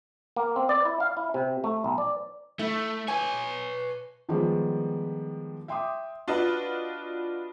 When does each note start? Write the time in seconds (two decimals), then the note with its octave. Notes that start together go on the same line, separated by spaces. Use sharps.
0.36 A#3
0.56 C4
0.69 D5
0.85 E4
1.00 F5
1.17 E4
1.34 C3
1.64 A3
1.84 B1
1.98 D5
2.59 A3 E4
3.08 B4 C#5 G#5
4.29 D#3 F3 G3 G#3 B3
5.68 E5 G5 C6 D6 D#6
6.28 D4 F4 F#4 B4 D#5